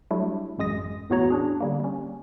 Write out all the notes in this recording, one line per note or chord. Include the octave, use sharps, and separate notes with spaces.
F#3 G3 A3 D4 E4
A1 F#2 G#3 D#6 A#6
E2 A2 B3 F#4 C#5 A#5
C#4 D4 G#4
D3 G3 A#3
G3 C#4